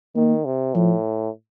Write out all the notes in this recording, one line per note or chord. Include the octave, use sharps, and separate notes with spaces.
D#3 A#3
C3
A2 F3